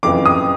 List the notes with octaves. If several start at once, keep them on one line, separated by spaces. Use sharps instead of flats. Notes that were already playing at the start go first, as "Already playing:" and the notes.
F#1 F2 C#3 E3 D6
D#6